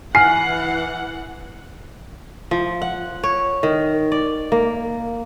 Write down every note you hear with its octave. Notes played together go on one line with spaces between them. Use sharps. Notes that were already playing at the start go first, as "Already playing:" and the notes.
E3 F#5 G#5 F6 C7
F3
F#5
C#5
D#3
D5
A#3